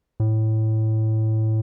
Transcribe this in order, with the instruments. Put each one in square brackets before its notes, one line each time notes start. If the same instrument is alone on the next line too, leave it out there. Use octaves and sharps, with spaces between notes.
[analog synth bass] A2